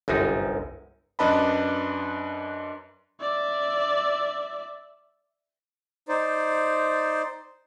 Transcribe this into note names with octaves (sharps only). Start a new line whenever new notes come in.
G1 C2 F#2 D#4
F#2 D4 B4 D#5 A5 B5
D5 E5
D#4 C5 D5